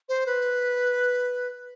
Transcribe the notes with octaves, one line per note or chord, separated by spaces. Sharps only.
C5
B4